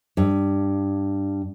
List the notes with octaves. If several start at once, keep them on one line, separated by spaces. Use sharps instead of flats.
G2